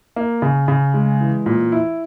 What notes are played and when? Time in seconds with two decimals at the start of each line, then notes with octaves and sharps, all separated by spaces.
0.16 A#3
0.42 C#3
0.68 C#3
0.94 G#3
1.21 E3
1.46 A#2
1.72 E4